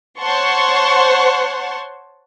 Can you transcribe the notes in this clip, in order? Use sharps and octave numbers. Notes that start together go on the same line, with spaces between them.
C5 C#5 F#5 A5 C6 C#6